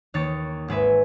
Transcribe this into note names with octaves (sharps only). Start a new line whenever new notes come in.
D#2 D#3 A#3 C#5 A6
G#1 G#3 B4 E5